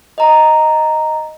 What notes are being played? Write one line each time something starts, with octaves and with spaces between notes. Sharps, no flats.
D#5 A#5